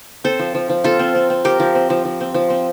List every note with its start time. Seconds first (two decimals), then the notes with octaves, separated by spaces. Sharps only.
0.24 C4 A4 C5
0.39 F3
0.55 F3
0.70 F3
0.84 C4 F4 A4
0.99 C4
1.15 C4
1.30 C4
1.44 F3 G4 A#4
1.60 F3
1.75 C4
1.90 F3
2.05 F3
2.21 C4
2.34 F3
2.50 C4